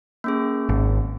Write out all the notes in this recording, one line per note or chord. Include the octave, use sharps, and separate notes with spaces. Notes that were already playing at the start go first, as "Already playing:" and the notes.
A#3 C#4 G#4
G#1